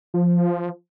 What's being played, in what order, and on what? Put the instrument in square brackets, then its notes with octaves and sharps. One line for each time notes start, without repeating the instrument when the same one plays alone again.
[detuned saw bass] F3